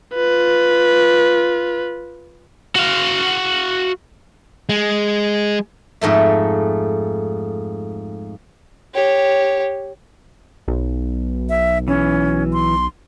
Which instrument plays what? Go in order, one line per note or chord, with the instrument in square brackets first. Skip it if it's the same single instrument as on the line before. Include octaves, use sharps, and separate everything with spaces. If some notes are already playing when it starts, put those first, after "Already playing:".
[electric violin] F4 B4
[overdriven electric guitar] F#4 F5
[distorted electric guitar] G#3
[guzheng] F2 G#2 A3 E5
[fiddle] G4 C#5
[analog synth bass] B1
[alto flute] E5
[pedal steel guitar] E3 [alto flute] C#4
[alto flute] C6